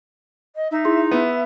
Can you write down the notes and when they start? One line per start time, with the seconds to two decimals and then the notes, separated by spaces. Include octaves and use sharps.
0.56 D#5
0.71 D#4 E5
0.85 E4 G#4 C6
1.11 B3 E5